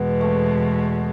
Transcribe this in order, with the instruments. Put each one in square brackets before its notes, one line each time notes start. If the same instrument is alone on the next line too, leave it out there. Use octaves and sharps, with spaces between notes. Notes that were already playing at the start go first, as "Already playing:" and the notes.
Already playing: [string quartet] E2 B2 G#3 [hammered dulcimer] B3
[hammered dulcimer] A3